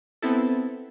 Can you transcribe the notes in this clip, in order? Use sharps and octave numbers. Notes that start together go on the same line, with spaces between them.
B3 C4 E4 A4